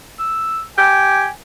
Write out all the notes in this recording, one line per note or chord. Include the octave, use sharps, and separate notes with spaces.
E6
G4 G#5